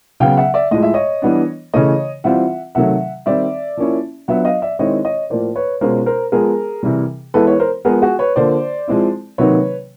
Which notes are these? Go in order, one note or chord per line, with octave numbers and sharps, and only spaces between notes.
C#3 F#3 B3 F5 G5
E5 F#5
D5 E5
A2 F3 G#3 D#5
E5
C#5 D#5
E3 G3 B3 D4
C#3 E3 A3 C#5 D#5
E3 G3 C4 F4 E5 F#5
C3 D#3 F#3 A3 E5 F#5
D#3 G3 C4 D5 E5
F3 A#3 C#4 E4
F#3 B3 D4 F4 E5 F#5
D#5 F5
D5 E5
D#3 G#3 C4 E4 C#5 D#5
C#5 D#5
A2 F3 A#3 C5 D5
B4 C#5
B2 G#3 C#4 F4 A#4 C5
A#4 C5
F3 G#3 B3 G#4 A#4
C3 E3 G3
E3 G#3 B3 E4 A4 B4
B4 C#5
A#4 C5
F3 G#3 B3 G#4 A#4
F#4 G#4
B4 C#5
D3 F3 A#3 C5 D5
F3 G#3 C4 E4
C3 D#3 F#3 A#3 D#4 B4 C#5